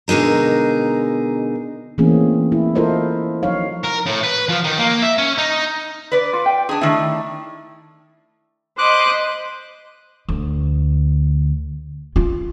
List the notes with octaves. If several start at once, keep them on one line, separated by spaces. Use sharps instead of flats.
B2 D3 G#3 D#4 A#4
E3 A3 A#3 C4 C#4 G#4
E4
E4 F4 A4 A#4 C5 D#5
F3 F#3 D#4 C#5 F5
A#4
A2
B4
F3
D#3
A#3
E5
C#4
D#4
B4 D5
F4
G5
D4 D#4 G#4
D#3 A3 D4 E4
C5 D#5 B5 D6 F#6
D2
F4